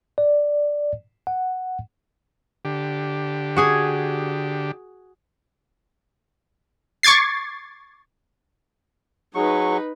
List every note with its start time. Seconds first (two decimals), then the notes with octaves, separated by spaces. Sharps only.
0.18 D5
1.27 F#5
2.65 D3 G4
3.56 F#4 G#4 G#5
7.03 C#6 D6 G#6 A6 C7
9.35 F#3 D#4 G#4 B4 C#6